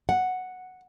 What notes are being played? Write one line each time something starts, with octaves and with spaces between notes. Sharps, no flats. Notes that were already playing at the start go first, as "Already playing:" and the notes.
F#5